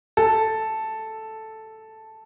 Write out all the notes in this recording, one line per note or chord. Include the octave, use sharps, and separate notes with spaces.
A4